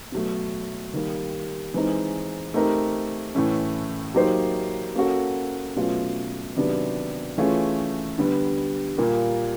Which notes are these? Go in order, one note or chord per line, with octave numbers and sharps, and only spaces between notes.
B2 F#3 A3
D#3 G3 A#3
E3 G#3 C4 D#4
A3 C4 D#4 G4 A#4
A2 E3 A3 C#4
F#3 A#3 D#4 G4 C5
A#3 C#4 F#4 A4
B2 F#3 A3 C#4 F4
C3 D#3 F#3 B3 D4
E3 A3 C#4 F4 G#4
D3 G3 B3
A#2 G3 A#3